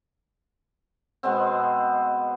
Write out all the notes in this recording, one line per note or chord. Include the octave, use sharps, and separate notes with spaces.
B2 G#3 B3 C4